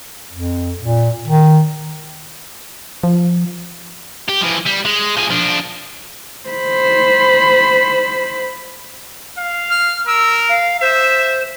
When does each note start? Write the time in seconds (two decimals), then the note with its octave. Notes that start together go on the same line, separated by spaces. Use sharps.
0.33 F2
0.82 A#2
1.28 D#3
3.03 F3
4.28 G4
4.41 E3 F3
4.66 G3
4.85 G#3
5.17 F3 G#4
5.30 F3 D4
6.49 C5 B5
9.38 F5
9.70 F6
10.07 A#4 E6
10.49 F5
10.81 C5 E5